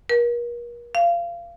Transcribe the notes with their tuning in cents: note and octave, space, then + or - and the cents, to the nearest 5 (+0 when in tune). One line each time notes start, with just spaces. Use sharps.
A#4 +40
F5 -25